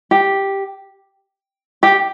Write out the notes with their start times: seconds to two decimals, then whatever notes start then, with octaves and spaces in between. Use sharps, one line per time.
0.11 G4
1.83 G4